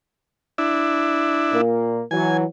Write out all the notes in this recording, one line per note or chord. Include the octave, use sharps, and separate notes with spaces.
D4 E4
A#2 A#3
E3 F#3 G#5